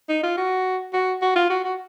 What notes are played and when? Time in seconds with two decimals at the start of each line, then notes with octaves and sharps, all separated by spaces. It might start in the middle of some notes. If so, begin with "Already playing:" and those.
0.09 D#4
0.23 F4
0.37 F#4
0.93 F#4
1.22 F#4
1.36 F4
1.50 F#4
1.65 F#4